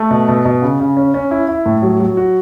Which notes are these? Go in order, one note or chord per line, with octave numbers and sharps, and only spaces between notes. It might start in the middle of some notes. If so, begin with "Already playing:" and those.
Already playing: A3
B2
B2
B2
C#3
C#3
C#4
C#4
E4
E4
A2
F#3
F#3
F#4